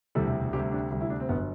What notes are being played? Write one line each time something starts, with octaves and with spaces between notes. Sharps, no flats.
E1 D2 C3 E3 G3 A4
D2 C3 G3 G4
D4
D2 C3 G3
E4
D4
C4
G1 F#3 B3